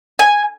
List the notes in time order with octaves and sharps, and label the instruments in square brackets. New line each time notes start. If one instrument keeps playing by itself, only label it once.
[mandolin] G#5